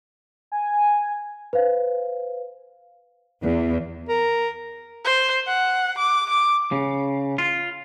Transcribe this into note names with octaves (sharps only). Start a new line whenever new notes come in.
G#5
B4 C5 F5
E2
A#4
C5
F#5
D6
D6
C#3
F4